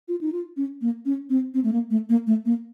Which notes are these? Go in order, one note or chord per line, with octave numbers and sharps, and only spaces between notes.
F4
D#4
F4
C#4
A#3
C#4
C4
C4
A3
A#3
A3
A#3
A3
A#3